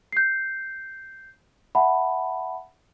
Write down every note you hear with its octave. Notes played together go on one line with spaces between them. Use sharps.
G6 C7
E5 F#5 A5 B5